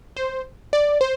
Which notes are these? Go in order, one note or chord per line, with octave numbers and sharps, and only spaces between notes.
C5
D5
C5